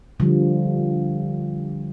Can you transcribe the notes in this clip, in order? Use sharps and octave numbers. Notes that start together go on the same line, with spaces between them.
D3 F3 G3